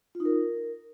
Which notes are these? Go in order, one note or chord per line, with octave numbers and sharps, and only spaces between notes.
F4
D#4
A#4